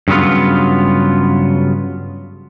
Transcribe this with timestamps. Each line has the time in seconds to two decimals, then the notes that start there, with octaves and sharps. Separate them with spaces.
0.08 G2 C#3 F#3 B3 F4